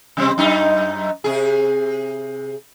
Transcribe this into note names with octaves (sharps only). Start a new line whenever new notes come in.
C3 G3 C4
F#2 D#4
C3 G#4